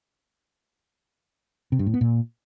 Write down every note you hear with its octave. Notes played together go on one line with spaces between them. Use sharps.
C3
G2
A2
B3
A#2